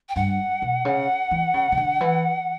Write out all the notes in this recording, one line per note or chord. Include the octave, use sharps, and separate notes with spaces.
G5
G2 F#5
B2
C#3
E3
C#3
C#3
D3
E3